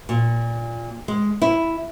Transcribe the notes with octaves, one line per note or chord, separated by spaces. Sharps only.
A#2
G#3
E4